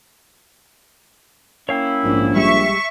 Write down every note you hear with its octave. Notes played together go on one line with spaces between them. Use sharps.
A#3 C#4 E4 C#5 F5 G5
A#1 G#2
G3 G#3 G4 E5 C#6